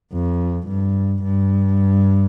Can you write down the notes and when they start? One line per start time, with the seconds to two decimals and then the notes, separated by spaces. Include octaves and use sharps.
0.13 F2
0.68 G2
1.23 G2